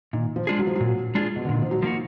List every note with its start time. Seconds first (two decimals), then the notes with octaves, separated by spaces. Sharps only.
0.13 A#2 D#3
0.36 F3
0.47 G#3 D4 F4 G#4
0.59 F#3
0.67 F3
0.75 A#2 F#3
1.15 G#3 D4 F4 G#4
1.36 B2
1.45 D3
1.49 A#2 D#3
1.62 F3
1.71 F#3
1.83 F3 A#3 D#4 F#4